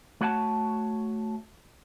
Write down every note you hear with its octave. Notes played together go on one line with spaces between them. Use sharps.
A3 F#4 C#5 F#5 G#5 A5